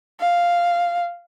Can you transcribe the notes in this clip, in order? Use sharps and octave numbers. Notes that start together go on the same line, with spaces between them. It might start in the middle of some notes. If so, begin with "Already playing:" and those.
F5